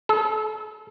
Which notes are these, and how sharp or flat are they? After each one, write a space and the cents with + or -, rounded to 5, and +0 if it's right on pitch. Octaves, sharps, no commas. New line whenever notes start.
A4 -40